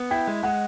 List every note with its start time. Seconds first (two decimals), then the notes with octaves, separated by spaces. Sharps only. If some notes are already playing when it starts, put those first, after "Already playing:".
Already playing: B3
0.11 E4 G5
0.27 G#3
0.43 G#3 F#5